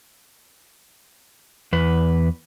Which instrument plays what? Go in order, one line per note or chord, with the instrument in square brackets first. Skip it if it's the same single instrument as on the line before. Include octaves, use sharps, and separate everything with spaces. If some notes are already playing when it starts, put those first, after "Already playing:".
[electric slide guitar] E2 B4